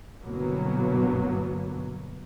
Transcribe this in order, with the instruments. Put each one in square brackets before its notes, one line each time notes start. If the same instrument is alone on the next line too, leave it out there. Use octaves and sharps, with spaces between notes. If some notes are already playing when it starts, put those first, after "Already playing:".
[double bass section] G1 C2 B2 F#3 A#3 B3